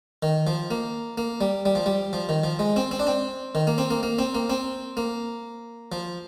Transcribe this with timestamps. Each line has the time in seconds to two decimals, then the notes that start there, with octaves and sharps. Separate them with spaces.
0.23 D#3
0.47 F3
0.71 A#3
1.18 A#3
1.41 G3
1.66 G3
1.75 F3
1.86 G3
2.13 F3
2.29 D#3
2.44 F3
2.59 G#3
2.76 C4
2.91 C4
3.00 D4
3.07 C4
3.55 D#3
3.67 A#3
3.78 C4
3.91 A#3
4.03 A#3
4.19 C4
4.35 A#3
4.50 C4
4.97 A#3
5.92 F3